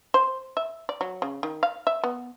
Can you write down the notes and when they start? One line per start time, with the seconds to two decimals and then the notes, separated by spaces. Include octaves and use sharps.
0.14 C5
0.57 E5
0.89 D5
1.01 F#3
1.22 C#3
1.43 D#3
1.63 F5
1.87 E5
2.04 B3